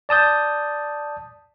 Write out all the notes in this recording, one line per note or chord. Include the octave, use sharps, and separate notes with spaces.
D5 A5 D#6 G6